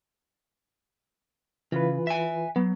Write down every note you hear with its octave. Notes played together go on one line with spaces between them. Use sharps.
C#3 E3 F4 B4
E5 G#5
F#3 B3